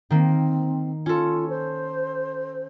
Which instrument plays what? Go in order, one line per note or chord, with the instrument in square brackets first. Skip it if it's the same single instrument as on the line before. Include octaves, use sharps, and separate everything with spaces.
[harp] D#3 A#3 [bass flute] C4
[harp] C#4 A4 [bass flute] F4
[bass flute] C5